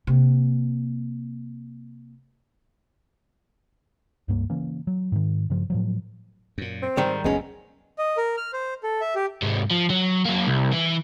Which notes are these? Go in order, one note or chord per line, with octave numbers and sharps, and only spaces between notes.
C3 A#3
C#2 G2 A#3
C#3 E3 A#3 C#4
F#3
G#2 D#3
G2 C#3 F3
A2 F3 F#3
F#2 A#2
C4
G#2 D#3 G3
F#1 D2 G#3 B3 C#4
D#5
A#4
F6
C5
A4
E5
G4
G#2 C3
F3
F#3
F#3 A#3
C2
E3